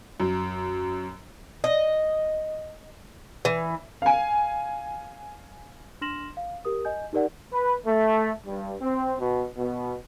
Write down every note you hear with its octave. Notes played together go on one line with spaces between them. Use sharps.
F#2
D#5
E3
F5 G#5
D4 C6 F6 A#6 E7 F#7
F5
G4 A#4 D#6
D#5 G#5 G6
D#4 G4 A#4 D5 F#5
B4
A3
G2
C4
B2
B2